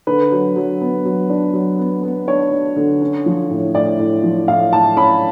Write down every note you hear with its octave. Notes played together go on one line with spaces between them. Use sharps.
D3 B4
F#3
F#3
B3
F#3
D4
F#3
B3
B3
D4 C#5
D4
D3
C#4
F3
A2
A2 D5
A2
F3
A2 F5
A2 A5
C#4 B5